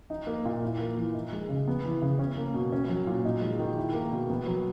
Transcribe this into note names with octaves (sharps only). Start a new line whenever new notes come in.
D#4
A#3
A#2
E4
A#3
E3
D#4
G#3
C#3
B3
E3
C#3
C#4
A#3
B2
C#4
F#3
A#2
D#4
G#3
D#3
E4
A#3
B2
B3
F#3